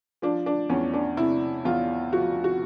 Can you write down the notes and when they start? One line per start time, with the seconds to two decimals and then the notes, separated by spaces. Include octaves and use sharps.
0.22 F3 D4
0.46 D4
0.69 E2 C#4
0.94 D4
1.17 C3 E4
1.65 E2 F4
2.13 F3 F#4
2.44 F#4